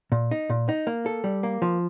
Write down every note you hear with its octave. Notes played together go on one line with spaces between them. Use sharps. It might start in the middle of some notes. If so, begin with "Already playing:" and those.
A#2
D#4
A#2
D#4
A#3
A4
G3
A#3
F3